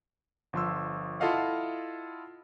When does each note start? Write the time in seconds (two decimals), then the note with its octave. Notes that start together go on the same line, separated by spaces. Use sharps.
0.53 G1 F3 C6 E6
1.20 E4 F4 A4 D#5 F5 F#5